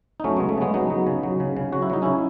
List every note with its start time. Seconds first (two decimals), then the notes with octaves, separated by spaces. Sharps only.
0.20 D#4
0.24 F#3 A3 C#4
0.37 C#3 G#3 B3
0.49 A3
0.58 C#3 G#3 B3
0.74 F#3 B3 D#4
0.90 F#3
1.07 C#3
1.23 F#3
1.40 C#3
1.57 C#3
1.72 F#3 F#4
1.82 E4
1.90 F#3 D#4
2.02 C#3 C#4 E4